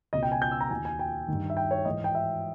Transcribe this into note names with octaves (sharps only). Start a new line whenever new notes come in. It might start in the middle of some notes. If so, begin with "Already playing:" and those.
C#2 B2 D#5
G5
G#5
G6
E6
A#5
D#2 D#3 G#5
G#5
G5
G2 D#3
E5
G5
C#5
G#2 E3 D#5
G5
E5